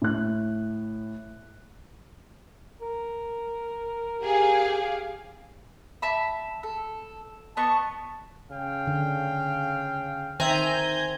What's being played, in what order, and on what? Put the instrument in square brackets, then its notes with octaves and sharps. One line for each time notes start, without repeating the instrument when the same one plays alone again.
[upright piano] A2 F#6
[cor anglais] A#4
[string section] G4 G#4 F5
[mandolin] E5 A5 B5
A4
[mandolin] B3 D#5 C#6 [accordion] A5
[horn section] C#3 F5 G5
[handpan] D3
[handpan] D#3 E5 [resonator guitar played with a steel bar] C4 [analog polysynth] G#5 A#5 G6